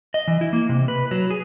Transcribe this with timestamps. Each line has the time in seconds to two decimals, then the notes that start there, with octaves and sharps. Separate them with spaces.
0.14 D#5
0.28 E3
0.41 E4
0.53 A#3
0.69 C3
0.88 B4
1.11 F#3
1.31 G#4